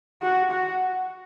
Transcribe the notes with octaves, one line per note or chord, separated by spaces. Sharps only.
F#4
F#4